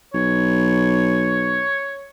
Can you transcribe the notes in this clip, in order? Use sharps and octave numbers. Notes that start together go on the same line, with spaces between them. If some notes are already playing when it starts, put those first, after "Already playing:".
B1 C#5